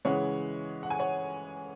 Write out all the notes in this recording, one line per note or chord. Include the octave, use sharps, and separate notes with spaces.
C#3 E3 G#3 C#5 F#5
F#5
G#5
C#5 F#5